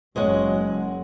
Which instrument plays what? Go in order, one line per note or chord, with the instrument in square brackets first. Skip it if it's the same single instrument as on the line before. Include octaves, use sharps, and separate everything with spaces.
[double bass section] F#1 [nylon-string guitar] G#3 C#5 F#5